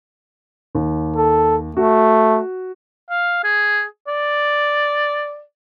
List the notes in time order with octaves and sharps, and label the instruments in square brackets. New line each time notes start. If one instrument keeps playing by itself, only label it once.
[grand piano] D#2
[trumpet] A4
[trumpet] A3 [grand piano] F#4
[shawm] F5
G#4
D5